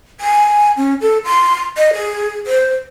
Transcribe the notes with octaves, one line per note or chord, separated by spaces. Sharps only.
G#5
C#4
A4
C6
D#5
G#4
C5